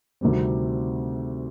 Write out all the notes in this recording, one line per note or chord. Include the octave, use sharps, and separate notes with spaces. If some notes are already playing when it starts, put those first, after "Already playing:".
D2 C3 D#3 G3 C4